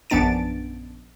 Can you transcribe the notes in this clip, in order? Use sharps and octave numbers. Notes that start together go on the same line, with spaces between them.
A#1 F#2 B3 D4 A6 D7